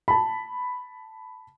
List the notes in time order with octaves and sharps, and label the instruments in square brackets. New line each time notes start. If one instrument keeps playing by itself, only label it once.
[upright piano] A5 B5